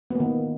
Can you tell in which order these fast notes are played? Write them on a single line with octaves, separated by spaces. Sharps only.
B3 A#3 D#3